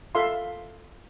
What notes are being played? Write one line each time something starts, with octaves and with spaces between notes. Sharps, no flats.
F4 A4 E5 F5 C6